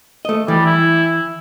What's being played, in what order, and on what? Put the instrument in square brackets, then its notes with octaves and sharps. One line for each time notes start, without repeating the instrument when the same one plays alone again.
[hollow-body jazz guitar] A3 D#5
[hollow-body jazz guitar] E3 [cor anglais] G3
[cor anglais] E4